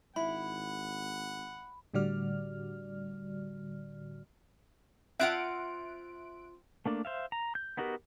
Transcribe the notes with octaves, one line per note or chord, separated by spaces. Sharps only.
G#1 E4 F#5 B5
A2 D3 G3 F#4 D5 F6
C4 F4 E5 F#5 F#6 D7
A3 A#3 D4
C5 E5 F5
A#5
G6
B3 D#4 F#4 G4 A#4